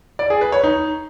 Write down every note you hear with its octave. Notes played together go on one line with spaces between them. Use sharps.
D5
G#4
B4
C#5
D#4